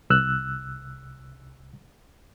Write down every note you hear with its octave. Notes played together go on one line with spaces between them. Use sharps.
C2 E6 F#6